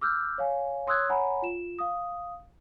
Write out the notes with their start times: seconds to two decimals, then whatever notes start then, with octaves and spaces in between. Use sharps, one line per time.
0.01 D6 E6 F6 G6
0.38 C#5 F5 G#5
0.87 C#5 C6 D#6 E6 F#6 G#6
1.09 C#5 F#5 G#5 A#5 B5
1.42 F4 E7
1.79 F5 D#6